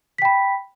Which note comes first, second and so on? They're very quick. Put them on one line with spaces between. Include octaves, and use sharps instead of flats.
B6 G5 B5